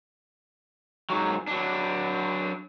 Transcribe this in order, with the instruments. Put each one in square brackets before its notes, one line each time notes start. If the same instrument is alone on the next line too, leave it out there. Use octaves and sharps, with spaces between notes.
[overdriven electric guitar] G#2 F#3
F#3 D4